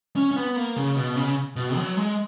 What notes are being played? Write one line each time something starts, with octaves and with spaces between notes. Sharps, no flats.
C#4
C#4
B3
A#3
C#3
B2
C#3
B2
F#3
G#3